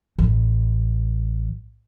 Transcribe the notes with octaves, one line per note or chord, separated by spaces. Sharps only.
A1 E3